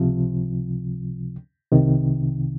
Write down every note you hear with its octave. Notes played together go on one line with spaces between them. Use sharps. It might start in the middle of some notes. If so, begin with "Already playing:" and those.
Already playing: C#2 C3 F3
C2 C3 D#3